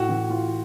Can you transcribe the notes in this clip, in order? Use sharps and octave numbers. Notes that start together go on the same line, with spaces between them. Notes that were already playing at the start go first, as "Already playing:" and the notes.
Already playing: A2 F#4
E3
E3 F4